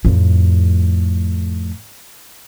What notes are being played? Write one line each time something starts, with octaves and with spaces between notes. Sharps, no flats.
F2 A2